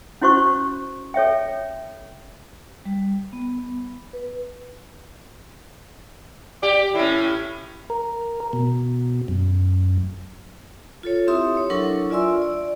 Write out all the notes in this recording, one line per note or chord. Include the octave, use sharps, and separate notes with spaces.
C#4 E4 F#4 C5 C#6
A4 C#5 E5 G5
G3
B3
B4
G4 D5
A2 C#4 E4
A#4
B2
F#2
F4 A4 C#5
C4 E4 G4 E5 C6 D#6
C#5
F#3 D4 E4 A4 A#4 C#6
F4 D5 E5 G#5 C6 E6
D5